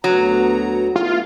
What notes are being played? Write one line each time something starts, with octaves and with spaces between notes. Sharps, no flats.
D2 F#3 B3 A#5
A3 B3 E4 F4